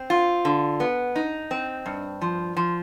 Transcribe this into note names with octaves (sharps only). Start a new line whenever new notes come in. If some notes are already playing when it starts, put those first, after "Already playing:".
Already playing: C4
F4
D3
B3
D#4
C4
G2
F3
F3